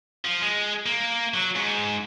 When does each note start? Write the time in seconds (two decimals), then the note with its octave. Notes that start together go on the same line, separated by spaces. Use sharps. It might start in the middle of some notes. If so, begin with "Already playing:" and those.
0.25 F3
0.41 G#3
0.86 A#3
1.34 F#3
1.56 G#2